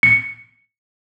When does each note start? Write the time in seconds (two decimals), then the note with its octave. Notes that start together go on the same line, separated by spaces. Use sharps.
0.03 C#7